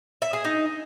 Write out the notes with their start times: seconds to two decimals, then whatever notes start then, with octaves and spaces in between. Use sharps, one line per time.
0.22 E5
0.33 G#4
0.45 D#4